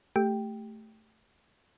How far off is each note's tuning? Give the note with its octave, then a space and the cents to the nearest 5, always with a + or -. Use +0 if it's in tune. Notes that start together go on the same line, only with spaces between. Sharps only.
A3 +0 G4 +0 G5 +0